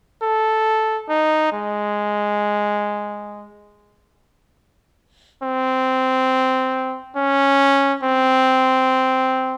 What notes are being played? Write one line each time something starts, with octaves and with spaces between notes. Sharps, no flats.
A4
D#4
G#3
C4
C#4
C4